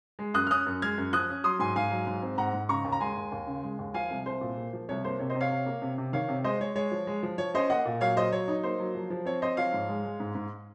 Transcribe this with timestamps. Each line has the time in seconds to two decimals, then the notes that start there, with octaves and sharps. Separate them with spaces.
0.19 G#3
0.34 F#2 D#6 F#6
0.47 F6
0.50 C#4 D#6 F#6
0.66 F#2
0.82 G#3 F6 G#6
0.98 F#2
1.13 F3 D#6 F#6
1.29 C#4
1.44 F#3 C6 D#6
1.59 G#2 G#5 C6
1.76 G#2 F5 G#5
1.91 F#3
2.07 G#2
2.22 C4
2.38 G#2 F#5 A#5
2.53 G#2
2.69 C#3 A#5 C#6
2.84 D#2
2.92 A#5
3.01 G#3 G#5 C6
3.16 D#2
3.32 D#2
3.47 C#3
3.64 G#3
3.79 D#2
3.94 F3 F5 G#5
4.10 C2
4.26 C2 C5
4.41 A#2
4.58 A#3
4.73 F3
4.89 C2 C#5
5.04 A#3 C5
5.19 C3 C#5
5.30 C5 D#5
5.35 C3
5.41 C#5 F5
5.51 C3
5.66 A#3
5.82 C3
5.98 C3
6.13 D#3 C#5 F5
6.28 C3
6.44 G#3 C5 D#5
6.60 G#3 C#5
6.75 G#3 C#5
6.92 F3
7.07 G#3
7.23 F3
7.38 F3 C#5
7.54 C#4 C5 D#5
7.70 A#3 D#5 F#5
7.85 A#2
8.01 F#3 C#5 F5
8.16 F#3 C5 D#5
8.32 F#3 C#5
8.48 D#4
8.63 A#3 C5
8.80 F#3
8.95 F3
9.10 F3
9.25 C4 C#5
9.42 C4 C5 D#5
9.57 F3 C#5 F5
9.73 G#2
9.89 G#3
10.05 G#3
10.20 G#2
10.35 G#2